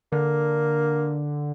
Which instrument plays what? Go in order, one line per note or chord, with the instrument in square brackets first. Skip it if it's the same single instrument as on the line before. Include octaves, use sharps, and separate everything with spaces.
[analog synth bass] D3 [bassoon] A#3